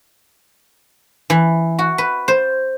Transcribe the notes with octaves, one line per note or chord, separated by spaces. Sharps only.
E3
F#4
B4
C5